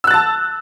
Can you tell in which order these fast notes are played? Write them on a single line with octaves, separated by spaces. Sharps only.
E6 F#6 A6 A5